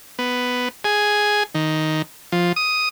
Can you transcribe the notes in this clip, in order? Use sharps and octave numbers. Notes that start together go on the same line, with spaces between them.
B3
G#4
D#3
F3
D#6